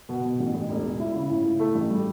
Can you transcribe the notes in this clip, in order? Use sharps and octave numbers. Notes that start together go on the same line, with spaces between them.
B2
B2
A1
A1
E1
E1
E4
C#3
A2
A2
A3
A1
G3